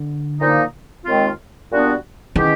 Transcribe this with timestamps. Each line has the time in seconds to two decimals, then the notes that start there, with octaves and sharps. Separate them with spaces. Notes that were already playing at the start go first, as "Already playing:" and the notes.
Already playing: D3
0.40 A#2 F3 A#3 D#4
1.05 D#2 D#3 G#3 C4 F4
1.70 A#2 G3 B3 D4 F#4
2.35 B2 D#3 G#3 C#4 E4 G4